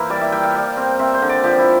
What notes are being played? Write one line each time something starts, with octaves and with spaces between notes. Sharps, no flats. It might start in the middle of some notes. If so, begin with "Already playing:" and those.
Already playing: E3 A#3 E4 A#4 C5
G3 D5
E5
G3 G5
F5
G3
C4
C4 E5
C5
D3
D5
F3 G4
E4